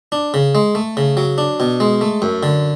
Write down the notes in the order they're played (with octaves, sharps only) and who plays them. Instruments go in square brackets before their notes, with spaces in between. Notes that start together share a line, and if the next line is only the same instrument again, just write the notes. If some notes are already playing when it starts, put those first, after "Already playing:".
[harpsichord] D4
C#3
G#3
A3
C#3
F#3
D4
B2
G#3
A3
F#2
D3